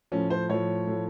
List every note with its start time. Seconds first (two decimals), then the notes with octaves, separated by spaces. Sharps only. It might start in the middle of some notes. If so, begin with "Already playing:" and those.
0.12 A2 F3 C#4
0.30 C5
0.49 A2 F3 C#5
0.87 A2 F3